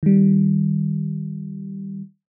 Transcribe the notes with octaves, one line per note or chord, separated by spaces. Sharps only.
D#3 G3